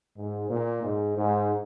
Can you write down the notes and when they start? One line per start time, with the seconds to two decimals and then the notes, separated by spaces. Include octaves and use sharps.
0.17 G#2
0.50 A#2
0.83 G#2
1.17 G#2